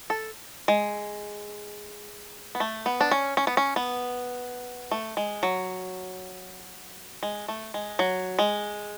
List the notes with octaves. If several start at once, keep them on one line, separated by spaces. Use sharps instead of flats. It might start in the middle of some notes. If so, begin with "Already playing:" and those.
A4
G#3
B3
A3
B3
D4
C#4
C#4
B3
C#4
B3
A3
G#3
F#3
G#3
A3
G#3
F#3
G#3